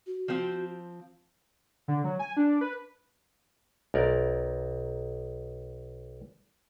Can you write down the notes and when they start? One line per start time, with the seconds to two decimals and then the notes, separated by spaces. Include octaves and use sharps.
0.06 F#4
0.28 F3 C4
1.88 D3
2.04 F#3
2.19 G#5
2.37 D4
2.61 B4
3.94 B1 A#4 D5